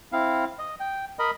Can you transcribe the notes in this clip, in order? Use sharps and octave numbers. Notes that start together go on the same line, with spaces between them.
C4 E4 F5
D#5
G5
A#4 D#5 B5